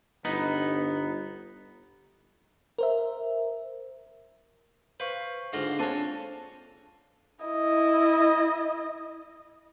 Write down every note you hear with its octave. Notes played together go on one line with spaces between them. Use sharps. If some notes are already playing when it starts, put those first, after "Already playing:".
G1 B3 D#4 B4
A#4 C5 E5
B4 C5 F5 C#6
G#2 D3 F4 F5 A#6
C4 D4 A4 C#5 G#5
E4 D#5